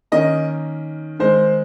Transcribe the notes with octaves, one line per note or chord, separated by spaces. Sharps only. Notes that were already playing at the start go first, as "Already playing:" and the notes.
D#3 A#3 C#4 D#5
D#3 G#3 C4 C5